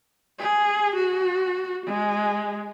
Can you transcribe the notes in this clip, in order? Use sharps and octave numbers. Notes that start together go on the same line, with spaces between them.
G#4
F#4
G#3